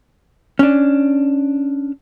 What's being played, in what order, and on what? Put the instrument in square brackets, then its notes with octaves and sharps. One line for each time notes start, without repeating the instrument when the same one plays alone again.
[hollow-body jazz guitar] C#4 D4